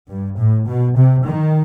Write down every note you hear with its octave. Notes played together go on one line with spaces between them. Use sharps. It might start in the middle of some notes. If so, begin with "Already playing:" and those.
G2
A2
B2
C3
D#3